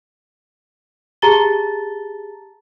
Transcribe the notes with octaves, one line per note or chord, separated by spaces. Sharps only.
G4 G#4 A5 A#5 A6 G7